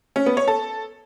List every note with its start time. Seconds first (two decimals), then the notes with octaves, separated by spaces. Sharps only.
0.16 C#4
0.26 B3
0.37 C#5
0.48 A4